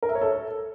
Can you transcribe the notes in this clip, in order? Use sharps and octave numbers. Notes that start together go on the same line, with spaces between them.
A#4
E5
C#5
A4